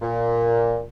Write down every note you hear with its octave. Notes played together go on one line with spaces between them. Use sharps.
A#2